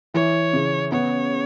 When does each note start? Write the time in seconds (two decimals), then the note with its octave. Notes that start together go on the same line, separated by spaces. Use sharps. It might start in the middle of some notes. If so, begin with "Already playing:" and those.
0.14 E3 C#5
0.53 C#3
0.92 B3 C#5